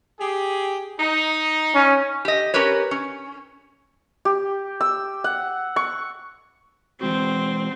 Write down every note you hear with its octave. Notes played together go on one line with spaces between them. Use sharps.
G4 G#4
D#4
C#4
G4 D#5
C#4 G4 A#4 B4 C#5
C#4
G4
E6
F#5
C#6
E3 G#3 C4 F#4